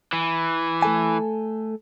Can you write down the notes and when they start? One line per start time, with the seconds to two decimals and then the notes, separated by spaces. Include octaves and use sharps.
0.13 E3
0.82 A3 A4 G#5